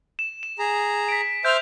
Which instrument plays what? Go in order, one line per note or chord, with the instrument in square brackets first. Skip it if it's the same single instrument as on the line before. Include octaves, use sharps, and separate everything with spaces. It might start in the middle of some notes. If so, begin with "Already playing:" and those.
[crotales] E7
E7
[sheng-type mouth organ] G#4 A#5
[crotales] B6 D7
[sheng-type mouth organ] C5 E5 F6 [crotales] G6 F7